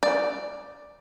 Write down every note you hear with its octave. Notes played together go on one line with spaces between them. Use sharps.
D5